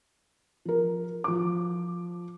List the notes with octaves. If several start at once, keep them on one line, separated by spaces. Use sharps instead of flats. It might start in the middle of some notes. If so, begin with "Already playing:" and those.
F3 A#4
F3 D6